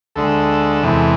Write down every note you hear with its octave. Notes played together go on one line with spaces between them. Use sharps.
D2 D3 G#3 A4
E2 C3 E3 G#3